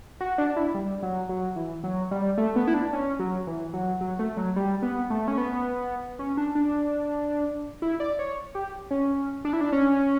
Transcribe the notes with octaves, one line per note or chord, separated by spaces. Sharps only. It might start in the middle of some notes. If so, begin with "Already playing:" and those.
F#4
D4
E4
G3
F#3
F#3
E3
F#3
G3
A3
B3
E4
D4
C#4
F#3
E3
F#3
F#3
A3
F#3
G3
B3
A3
C#4
B3
C#4
D4
D4
E4
D5
C#5
G4
C#4
D4
E4
D4
C#4